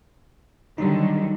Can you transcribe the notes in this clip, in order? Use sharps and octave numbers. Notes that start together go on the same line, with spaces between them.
D3 D#3 F#3 G3 D#4